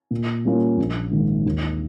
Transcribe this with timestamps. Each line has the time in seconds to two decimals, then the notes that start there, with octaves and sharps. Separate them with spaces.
0.11 A#2
0.45 G3 A#3 C#4 F4
0.78 A#1
1.11 G#2 D#3
1.46 D#2